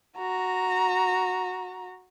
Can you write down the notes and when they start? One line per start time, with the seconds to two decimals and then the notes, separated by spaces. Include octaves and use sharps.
0.18 F#4 A#5